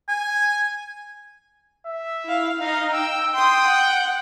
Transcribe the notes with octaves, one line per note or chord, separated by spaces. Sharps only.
G#5
E5
E4 F5
D#4 D#5 F5
G5 E6
G5 C6 D#6
F#5